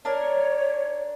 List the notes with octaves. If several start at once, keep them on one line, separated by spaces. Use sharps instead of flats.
D4 A#4 C#5